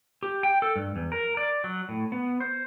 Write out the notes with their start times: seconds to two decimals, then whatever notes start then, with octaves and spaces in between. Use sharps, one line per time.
0.23 G4
0.43 G5
0.62 A4
0.76 G2
0.96 E2
1.12 A#4
1.37 D5
1.64 F#3
1.89 A2
2.12 B3
2.40 C5